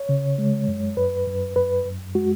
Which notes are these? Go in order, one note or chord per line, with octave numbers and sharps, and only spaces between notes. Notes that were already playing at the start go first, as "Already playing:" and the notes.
Already playing: C#5
C#3
G#3
F#2
F#2 B4
F#2
F#2 B4
F#2
G#3 F#4